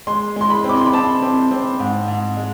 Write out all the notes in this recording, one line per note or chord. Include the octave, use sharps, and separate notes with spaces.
G#3 C6
G#3 C6
B5
C4
D6
C6
B5
C4 A5
C4
C4
G#2
G#2
G#3